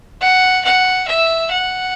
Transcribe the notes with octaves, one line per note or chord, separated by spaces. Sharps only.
F#5
F#5
E5
F#5